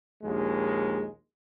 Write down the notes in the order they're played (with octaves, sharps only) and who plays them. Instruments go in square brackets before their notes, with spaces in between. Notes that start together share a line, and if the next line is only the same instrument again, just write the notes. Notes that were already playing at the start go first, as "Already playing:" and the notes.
[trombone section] A#1 D#2 G#3